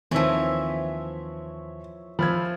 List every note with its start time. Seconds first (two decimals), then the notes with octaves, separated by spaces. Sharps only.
0.11 D#2 E3 F3 C4 C#5 E5
2.19 F3 B5 E6 F6 G#6